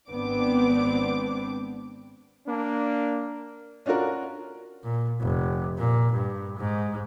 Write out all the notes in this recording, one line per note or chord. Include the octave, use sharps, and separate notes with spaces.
G#1 B3 C4 D4 D6
A#3 D4
C#4 D4 F4 F#4 A#4
A#2
F1
A#2
G2
G#2